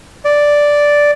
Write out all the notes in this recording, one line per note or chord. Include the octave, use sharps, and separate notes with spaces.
D5